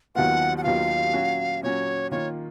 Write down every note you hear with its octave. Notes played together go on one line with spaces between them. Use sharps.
D#2 D#3 F#3 B3 F4 F#5
F#5
D#2 D#3 F#3 B3 F4 F5
A#2 F#3 C#4 F#4
A#2 F#3 C#4 F#4 C#5
D#3 A#3 F4 C#5